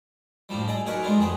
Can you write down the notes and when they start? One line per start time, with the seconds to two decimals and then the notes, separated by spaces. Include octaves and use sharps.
0.49 A2 D3 F3 G3
0.68 G#4 D5 D#5
0.86 B1 D#4 A#4 B4 G#5 C#6
1.03 G#3 B3 D4 F4
1.17 F2 D#3 G#4 B4